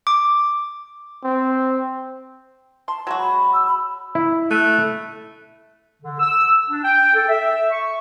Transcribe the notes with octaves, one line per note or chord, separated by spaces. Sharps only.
D6
C4
A5 C6
F#3 G#3 F#4
B5
E6
B5
E4
A3 E6 F#6 D#7
D3
E6
D4
G5
A4
E5
C#6